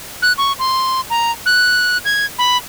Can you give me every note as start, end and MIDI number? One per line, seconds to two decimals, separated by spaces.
0.22 0.33 90
0.38 0.53 85
0.59 1.01 84
1.10 1.32 82
1.46 1.98 90
2.05 2.26 92
2.38 2.57 83